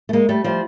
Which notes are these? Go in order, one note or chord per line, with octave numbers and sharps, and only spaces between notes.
A3
G#3 A#3
G3 A3
F3 G3